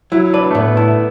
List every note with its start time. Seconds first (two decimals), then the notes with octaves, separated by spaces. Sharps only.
0.12 F#3 E4
0.34 D4 B4
0.51 A3
0.55 A2 B3
0.76 A3 E4